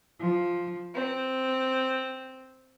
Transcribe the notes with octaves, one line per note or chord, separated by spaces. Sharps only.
F3
C4